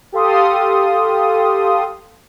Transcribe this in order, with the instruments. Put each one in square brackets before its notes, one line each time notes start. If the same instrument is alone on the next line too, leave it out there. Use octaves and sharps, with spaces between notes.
[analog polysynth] G4 A4 F5 C6 D#6